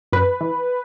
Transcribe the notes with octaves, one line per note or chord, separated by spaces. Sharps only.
F#2 B4
E3